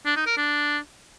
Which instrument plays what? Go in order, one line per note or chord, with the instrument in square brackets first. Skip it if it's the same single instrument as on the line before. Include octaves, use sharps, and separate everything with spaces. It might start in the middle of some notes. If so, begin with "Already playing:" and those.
[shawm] D4
D#4
A#4
D4